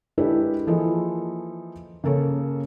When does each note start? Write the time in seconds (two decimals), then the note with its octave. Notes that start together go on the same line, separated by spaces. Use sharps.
0.18 G#3 D4 E4 G4 A4 B4
0.67 E3 F3 A#3 G#4 A4 D#5
2.04 C#3 A#3 A4 C#5